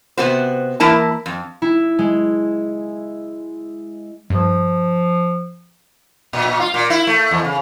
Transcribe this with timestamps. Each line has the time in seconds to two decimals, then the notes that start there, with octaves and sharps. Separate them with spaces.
0.17 C3 B3 F#4 C5
0.80 E3 A#3 E4 A5
1.26 F2
1.62 E4
1.99 G#3
4.30 G2 F3
6.33 A#2
6.46 A#2
6.60 F4
6.74 A#2
6.90 E4
7.07 A3
7.31 E2
7.45 C#3